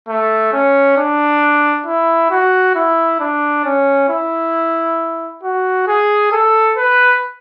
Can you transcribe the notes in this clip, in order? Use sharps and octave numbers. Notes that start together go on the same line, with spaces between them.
A3
C#4
D4
E4
F#4
E4
D4
C#4
E4
F#4
G#4
A4
B4